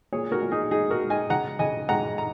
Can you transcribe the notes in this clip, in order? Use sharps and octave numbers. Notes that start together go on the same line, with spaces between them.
A#2 G#4 C#5
F#4 A#4
A#2
D#4 G#4
G#3 D#4 G#4
F#4 A#4
G#3
D#5 G#5
C#3 F#5 A#5
C#3 D#5 G#5
G#3 F#5 A#5
A#5